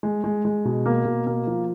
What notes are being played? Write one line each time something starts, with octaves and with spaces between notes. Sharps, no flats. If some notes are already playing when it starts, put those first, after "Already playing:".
G#3
G#3
G#3
B2
A#3
B2
A#3
F3